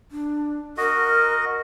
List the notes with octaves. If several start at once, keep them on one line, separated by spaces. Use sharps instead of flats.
D4
F#4 A#4 D#5